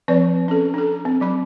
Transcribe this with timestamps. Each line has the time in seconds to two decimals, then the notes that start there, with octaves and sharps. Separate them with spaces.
0.08 F3 C4 B4 D5
0.48 C#4 A4
0.74 D4 A4
1.05 C4
1.21 F#3 B5